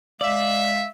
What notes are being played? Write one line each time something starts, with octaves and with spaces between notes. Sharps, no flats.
G#3 D5 E5 F5